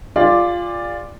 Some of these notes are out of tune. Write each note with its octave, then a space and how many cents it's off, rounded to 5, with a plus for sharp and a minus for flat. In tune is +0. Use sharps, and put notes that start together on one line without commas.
F4 +0 G#4 -45 D5 +5